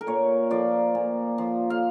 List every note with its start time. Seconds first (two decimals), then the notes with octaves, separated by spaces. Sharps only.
0.01 A#4
0.07 A#2 C#5
0.51 F3 D5
0.95 A#2
1.38 F3
1.70 F5